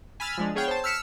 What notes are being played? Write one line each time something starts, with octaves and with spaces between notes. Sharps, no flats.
G#5 B5 E6 F6 A6
F3 G#3 D4
B3 G#4 C#5 F5 G5
C5 A5
E6 F6 B6 C#7 E7